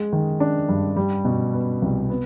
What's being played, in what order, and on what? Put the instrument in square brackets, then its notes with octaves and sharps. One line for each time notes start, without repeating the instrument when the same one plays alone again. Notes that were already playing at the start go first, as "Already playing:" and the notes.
Already playing: [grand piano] G#3
D#3
D4
G2
G3
B2
B3
C2
B3